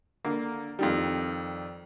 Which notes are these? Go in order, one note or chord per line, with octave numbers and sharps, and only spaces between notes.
D3 A#3
F2 D#3 G3